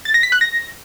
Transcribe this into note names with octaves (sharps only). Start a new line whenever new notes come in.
A6
A#6
B6
F#6
A#6